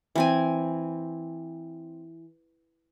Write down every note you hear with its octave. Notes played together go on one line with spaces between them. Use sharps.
E3 C4 G#5